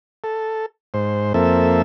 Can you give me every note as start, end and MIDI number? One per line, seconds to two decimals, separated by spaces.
0.24 0.66 69
0.94 1.33 44
0.94 1.33 72
1.34 1.82 41
1.34 1.82 58
1.34 1.82 60
1.34 1.82 69
1.34 1.82 76